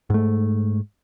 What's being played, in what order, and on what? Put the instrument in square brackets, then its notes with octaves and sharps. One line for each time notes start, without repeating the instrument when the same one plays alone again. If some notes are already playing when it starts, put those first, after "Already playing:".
[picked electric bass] G#2 A3